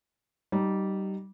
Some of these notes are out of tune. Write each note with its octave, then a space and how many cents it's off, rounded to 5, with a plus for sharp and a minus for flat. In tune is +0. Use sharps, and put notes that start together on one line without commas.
G3 -20 D#4 -15